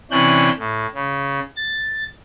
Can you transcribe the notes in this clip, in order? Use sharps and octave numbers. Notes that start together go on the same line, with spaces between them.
C3 E3 C#4 D4 F#6 G6
A2
C#3
A6